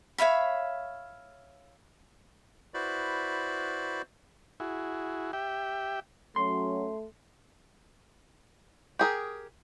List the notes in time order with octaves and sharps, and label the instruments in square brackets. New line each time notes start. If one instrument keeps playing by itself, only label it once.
[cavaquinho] C#5 E5 F5 B5
[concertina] E4 F#4 B4 C5 D5 B5
[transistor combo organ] E4 F#4 G#4
G4 E5 G5
[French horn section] F#3 C#4 [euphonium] A3 [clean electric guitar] C6
[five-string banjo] G4 G#4 A#4